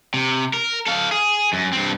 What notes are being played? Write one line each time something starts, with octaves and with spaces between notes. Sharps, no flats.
C3
A#4
A4 F5
G#4
F#2
G2 C4